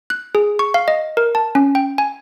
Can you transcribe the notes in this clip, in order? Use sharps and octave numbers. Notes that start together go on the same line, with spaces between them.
F#6
G#4
C#6
F5
D#5
A#4
A5
C#4
G5
G#5